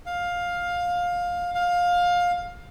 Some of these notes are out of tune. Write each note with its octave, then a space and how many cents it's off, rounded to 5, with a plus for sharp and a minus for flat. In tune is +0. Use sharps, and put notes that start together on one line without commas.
F5 +15
F5 +20